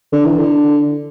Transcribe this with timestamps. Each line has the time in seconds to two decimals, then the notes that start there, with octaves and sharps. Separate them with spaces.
0.13 D3
0.25 E3
0.38 D3